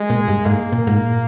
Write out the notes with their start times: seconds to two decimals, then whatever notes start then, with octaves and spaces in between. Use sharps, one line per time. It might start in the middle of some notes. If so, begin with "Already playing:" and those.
Already playing: G#3
0.10 A#2
0.28 G2
0.45 G#2 A#3
0.72 A#2
0.87 G#2
0.99 A#2